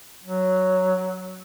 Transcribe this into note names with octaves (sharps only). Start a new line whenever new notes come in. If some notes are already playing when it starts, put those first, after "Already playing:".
F#3